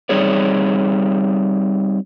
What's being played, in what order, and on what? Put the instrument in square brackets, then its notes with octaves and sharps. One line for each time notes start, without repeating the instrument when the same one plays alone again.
[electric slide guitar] G3 C4 D#4 G#4 C#5 D5